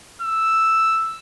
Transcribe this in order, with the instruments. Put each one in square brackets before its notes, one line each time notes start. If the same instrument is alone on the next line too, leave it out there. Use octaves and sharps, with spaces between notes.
[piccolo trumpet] E6